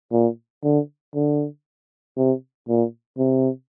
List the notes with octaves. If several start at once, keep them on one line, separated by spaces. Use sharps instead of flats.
A#2
D3
D3
C3
A#2
C3